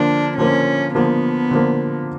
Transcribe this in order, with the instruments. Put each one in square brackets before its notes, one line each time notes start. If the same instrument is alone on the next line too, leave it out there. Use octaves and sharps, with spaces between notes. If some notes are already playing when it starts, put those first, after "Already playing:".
Already playing: [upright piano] D3 F3 A#3 [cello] D4
[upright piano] D3 F3 A#3 [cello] C#4
[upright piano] D3 F3 A#3 [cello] B3
[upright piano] D3 F3 A#3